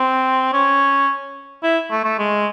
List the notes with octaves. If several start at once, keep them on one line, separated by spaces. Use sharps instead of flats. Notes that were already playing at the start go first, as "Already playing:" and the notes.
Already playing: C4
C#4
E4
A3
A3
G#3